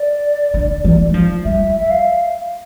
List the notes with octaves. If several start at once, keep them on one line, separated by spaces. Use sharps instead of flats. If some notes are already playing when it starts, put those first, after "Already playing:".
Already playing: D5
D3
E3
G3
F3
G3 E5
E5
F5